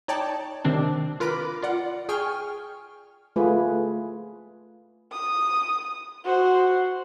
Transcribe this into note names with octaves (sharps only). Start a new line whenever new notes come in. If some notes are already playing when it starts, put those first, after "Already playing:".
D#4 C#5 D5 G5 A5
C3 D#3 C4 D4
F4 A#4 B4 B5 D6
F4 D5 F#5
G#4 G5 G#5 C#6 F6
A3 F4 G#4 B4
D#6
F#4 C5